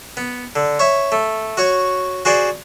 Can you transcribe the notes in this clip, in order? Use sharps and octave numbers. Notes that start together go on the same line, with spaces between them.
B3
D3
C#5 E5
A3
F#4 C#5
F#4 G#4 C5 D5